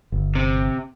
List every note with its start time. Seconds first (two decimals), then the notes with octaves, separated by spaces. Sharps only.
0.12 G1
0.35 C3